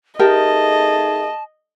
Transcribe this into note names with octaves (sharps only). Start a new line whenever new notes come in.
A3 D#4 G4 G#4 A#4 D#5 A5